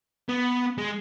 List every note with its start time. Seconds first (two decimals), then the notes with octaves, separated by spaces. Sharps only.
0.29 B3
0.78 G#3